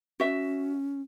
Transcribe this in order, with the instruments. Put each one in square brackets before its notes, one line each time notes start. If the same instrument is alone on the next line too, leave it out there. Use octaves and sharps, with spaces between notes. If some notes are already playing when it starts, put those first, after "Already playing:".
[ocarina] C#4 [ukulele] F#4 E5